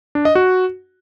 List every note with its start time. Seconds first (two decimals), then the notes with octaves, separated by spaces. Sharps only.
0.15 D4
0.25 D#5
0.35 F#4